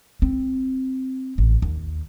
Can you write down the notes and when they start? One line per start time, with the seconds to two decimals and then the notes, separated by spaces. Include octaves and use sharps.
0.22 C4
1.38 A1
1.62 D#2